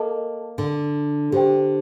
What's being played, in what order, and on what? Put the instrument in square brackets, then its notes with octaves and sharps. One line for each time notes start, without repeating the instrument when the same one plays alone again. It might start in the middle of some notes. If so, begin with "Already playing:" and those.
Already playing: [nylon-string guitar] A#3 [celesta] A4 D#5 A5
[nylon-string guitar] D3
[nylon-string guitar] D3 [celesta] G4 C5 G5